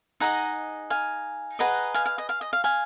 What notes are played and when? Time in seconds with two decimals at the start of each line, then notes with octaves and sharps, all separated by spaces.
0.20 D#4 G#4 D#5 F#5 A#5
0.90 F5 G#5
1.59 G#4 B4 D#5 F#5 A#5
1.94 F5 G#5
2.06 F5
2.18 D#5
2.29 F5
2.41 D#5
2.53 F5
2.64 F5 G#5